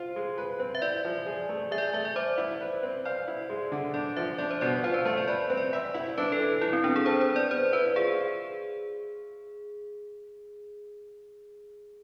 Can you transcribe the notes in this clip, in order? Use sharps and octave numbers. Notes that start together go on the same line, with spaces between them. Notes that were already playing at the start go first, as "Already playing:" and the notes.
Already playing: F4 C5
G#3
B4
C4
E5
E4 D5
F3
G#4
A3
G#4 E5
D5
E5
A3 E5
D5
C5 D5
E4
B4
C4
D5 F5
E4
G#3
D3
D4 D5
F3 E5
D4 D5
C5
B2 D5
F4 C5
B4
A3 C5
D5
B4 D5
C4
D5
E5
E4
D4 B4
A4
E3
E3 E4
C4
B3 D4
G#4
A4 C5
C5
B3
D5
B3 C5
E4 B4
F4 G#4